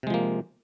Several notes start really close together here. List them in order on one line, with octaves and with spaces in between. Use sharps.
C3 G#3 F3 A#3